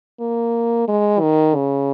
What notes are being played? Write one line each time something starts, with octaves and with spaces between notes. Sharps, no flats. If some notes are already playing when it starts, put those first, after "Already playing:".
A#3
G#3
D#3
C#3